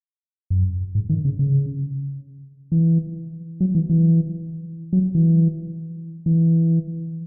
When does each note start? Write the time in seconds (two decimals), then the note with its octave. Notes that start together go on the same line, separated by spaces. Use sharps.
0.50 F#2
0.95 G#2
1.09 D#3
1.25 C#3
1.39 C#3
2.72 E3
3.61 F#3
3.75 E3
3.90 E3
4.93 F#3
5.15 E3
6.26 E3